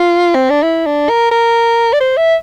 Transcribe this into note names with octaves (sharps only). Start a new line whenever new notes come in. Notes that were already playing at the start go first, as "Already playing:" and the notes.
Already playing: F4
C4
D4
E4
D4
A#4
A#4
D5
C5
E5